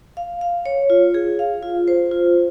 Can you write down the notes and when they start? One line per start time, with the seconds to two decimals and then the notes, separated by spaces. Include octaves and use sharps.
0.17 F5
0.41 F5
0.65 C#5
0.90 F4
1.14 G#4
1.39 F5
1.63 F4
1.88 C5
2.11 F4